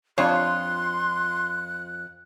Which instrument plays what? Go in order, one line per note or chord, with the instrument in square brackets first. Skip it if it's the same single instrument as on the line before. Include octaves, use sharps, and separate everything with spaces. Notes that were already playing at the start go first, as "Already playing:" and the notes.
[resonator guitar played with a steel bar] F2 F4 [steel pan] D4 C#5 [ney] C6 [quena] F#6